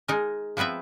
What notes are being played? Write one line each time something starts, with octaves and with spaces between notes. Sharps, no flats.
G#3 D#4 A#4
F3 B3 C4 B4 E5